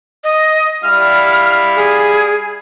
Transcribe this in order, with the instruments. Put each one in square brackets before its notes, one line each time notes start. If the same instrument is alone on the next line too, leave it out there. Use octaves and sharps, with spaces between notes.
[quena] D#5
[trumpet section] G3 E4 F5 [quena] F6
[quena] G#4